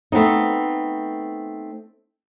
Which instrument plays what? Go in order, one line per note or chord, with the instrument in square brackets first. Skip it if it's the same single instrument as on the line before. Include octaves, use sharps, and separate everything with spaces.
[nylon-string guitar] A3 B3 C4 D#4